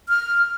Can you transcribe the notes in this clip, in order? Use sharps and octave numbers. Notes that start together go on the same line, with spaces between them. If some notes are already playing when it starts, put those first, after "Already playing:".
F6